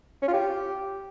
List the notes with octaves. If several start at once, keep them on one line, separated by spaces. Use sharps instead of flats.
C#4
F4
G4